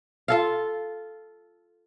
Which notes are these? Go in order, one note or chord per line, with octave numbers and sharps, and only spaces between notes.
F4 A4 F5